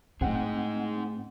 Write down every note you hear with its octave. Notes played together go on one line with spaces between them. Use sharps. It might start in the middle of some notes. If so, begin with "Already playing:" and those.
A2 C4 D#4 G#4 F#5